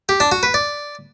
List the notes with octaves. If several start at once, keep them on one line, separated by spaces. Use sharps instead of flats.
G4
D4
F#4
B4
D5